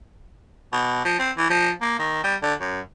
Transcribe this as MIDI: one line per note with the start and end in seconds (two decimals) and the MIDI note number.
0.73 1.03 47
1.05 1.17 53
1.19 1.31 60
1.38 1.49 52
1.50 1.71 53
1.81 1.98 58
1.99 2.21 51
2.24 2.36 55
2.42 2.54 50
2.60 2.80 42